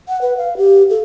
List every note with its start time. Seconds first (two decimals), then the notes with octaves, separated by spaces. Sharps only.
0.08 F#5
0.22 B4
0.37 F5
0.57 G4
0.90 A4